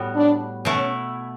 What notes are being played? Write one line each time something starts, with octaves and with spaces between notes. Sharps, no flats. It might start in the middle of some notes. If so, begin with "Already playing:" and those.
Already playing: A2 G3 B3 F#4
D4
B2 A3 C#4 E4